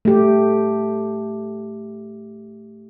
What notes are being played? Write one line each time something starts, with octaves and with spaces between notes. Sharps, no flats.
A3 G4